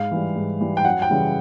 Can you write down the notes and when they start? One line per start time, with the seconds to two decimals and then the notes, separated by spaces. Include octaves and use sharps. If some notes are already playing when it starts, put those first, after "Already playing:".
Already playing: G#2 F5
0.11 E3 G3
0.36 G#2
0.60 E3 G3
0.77 G5
0.85 F#2 F#5
1.02 G5
1.10 C#3 E3 G3